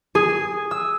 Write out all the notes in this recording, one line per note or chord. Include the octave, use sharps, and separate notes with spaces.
G#4
E6